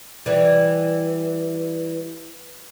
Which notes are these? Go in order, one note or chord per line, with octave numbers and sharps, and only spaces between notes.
E3 G3